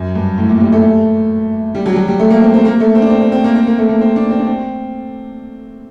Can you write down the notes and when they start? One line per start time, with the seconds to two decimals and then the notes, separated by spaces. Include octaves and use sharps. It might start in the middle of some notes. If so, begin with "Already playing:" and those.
Already playing: F#2
0.15 G2
0.38 A2
0.49 A#2
0.60 G3
0.73 A3
1.75 G3
1.86 F#3
1.92 G3
1.96 F#3
2.08 G3
2.20 A3
2.30 A#3
2.42 C4
2.54 C4
2.65 A#3
2.80 A3
2.95 C4
3.02 D4
3.10 C4
3.21 C4
3.32 C4
3.44 A#3
3.55 C4
3.67 A#3
3.78 A3
3.89 A#3
4.01 C4
4.16 D4
4.31 C4
4.39 D4
4.47 C4